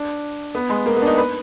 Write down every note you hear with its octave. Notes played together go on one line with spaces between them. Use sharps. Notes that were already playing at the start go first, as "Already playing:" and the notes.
Already playing: D4
B3
G#3
A#3
B3
D4
D#4
B4